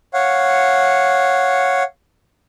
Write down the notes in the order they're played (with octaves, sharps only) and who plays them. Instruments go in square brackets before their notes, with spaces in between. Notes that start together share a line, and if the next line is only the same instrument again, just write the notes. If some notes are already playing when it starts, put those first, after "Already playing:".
[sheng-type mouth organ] C#5 F5 F#5